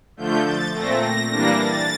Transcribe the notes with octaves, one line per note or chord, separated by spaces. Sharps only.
D3 F3 A3 G6
A6
A#2 A3 C4 A#6
A#6
E3 G3 A#3 D4 A#6
A6